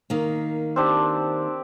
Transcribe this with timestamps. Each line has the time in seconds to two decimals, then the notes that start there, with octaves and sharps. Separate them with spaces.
0.10 D#3 A#3
0.76 C4 D4 G4